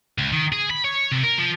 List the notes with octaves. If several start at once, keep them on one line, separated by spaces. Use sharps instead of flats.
C#2
D#3
G#4
B5
C#5
C3
A#4
F3